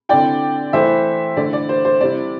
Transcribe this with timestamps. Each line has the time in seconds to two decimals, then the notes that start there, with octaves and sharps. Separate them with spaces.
0.09 D3 C4 E4 D5 G5
0.73 E3 A3 E4 C5 E5
1.37 D3 A3 E4 D5
1.53 D5
1.69 C5
1.85 C5
2.01 C3 G3 C4 E4 D5